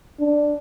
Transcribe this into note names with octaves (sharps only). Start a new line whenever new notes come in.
D4